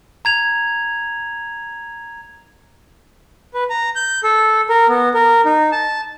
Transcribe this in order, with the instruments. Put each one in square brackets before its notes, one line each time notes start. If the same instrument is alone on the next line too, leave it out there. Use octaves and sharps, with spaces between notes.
[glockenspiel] A#5 G#6 F7
[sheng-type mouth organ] B4
A#5
G6
A4
A#4
B3
A#4
D#4
A5